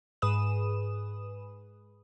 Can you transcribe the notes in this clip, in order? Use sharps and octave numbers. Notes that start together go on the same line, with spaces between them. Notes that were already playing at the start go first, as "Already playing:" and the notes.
G#2 G#4 B4 D#6 E7